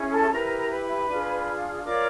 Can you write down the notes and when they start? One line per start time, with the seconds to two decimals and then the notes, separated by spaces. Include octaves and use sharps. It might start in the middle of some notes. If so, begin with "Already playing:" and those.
Already playing: C#4 E4 G#4
0.11 A4 A5
0.25 A5
0.31 E4 G4 A#4 B4 A#5
0.43 A#4 A#5
0.57 A#4 A#5
0.70 B4 B5
1.08 D4 F4 G#4
1.84 F4 A#4 C#5 D5 D6